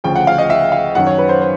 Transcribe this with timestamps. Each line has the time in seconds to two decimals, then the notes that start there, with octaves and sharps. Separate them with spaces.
0.04 D2 C#3 F3 G5
0.16 F#5
0.27 F5
0.38 D#5
0.50 E5
0.72 F5
0.95 F#2 D#3 F#3 F#5
1.07 C#5
1.18 B4
1.29 C5
1.42 C5